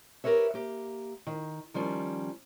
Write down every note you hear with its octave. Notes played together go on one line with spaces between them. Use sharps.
G4 A#4 B4 C#5 E5
A#3 G4
D#3
D#3 F3 G3 C#4